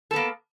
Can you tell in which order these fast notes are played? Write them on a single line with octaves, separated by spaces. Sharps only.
A4 B3 A#3